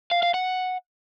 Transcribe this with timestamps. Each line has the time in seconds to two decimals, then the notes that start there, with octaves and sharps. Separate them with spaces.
0.11 F5
0.23 F5
0.34 F#5